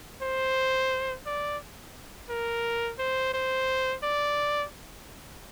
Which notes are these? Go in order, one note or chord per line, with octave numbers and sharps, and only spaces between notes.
C5
D5
A#4
C5
C5
D5